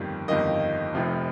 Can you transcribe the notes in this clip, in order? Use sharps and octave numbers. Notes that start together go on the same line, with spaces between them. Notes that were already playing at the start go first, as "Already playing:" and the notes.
Already playing: G1 F2 D#3 G3 A#3
G1 F2 D#3 G3 A#3 D#5
F1 F2 C3 F3